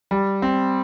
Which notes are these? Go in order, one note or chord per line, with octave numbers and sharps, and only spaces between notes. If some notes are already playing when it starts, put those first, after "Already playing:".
G3
C4